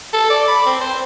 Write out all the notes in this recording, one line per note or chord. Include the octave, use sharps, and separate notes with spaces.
A4
D5
B5
C4
C5